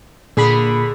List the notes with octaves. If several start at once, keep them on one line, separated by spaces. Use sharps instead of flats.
A#2 D3 G#4 B5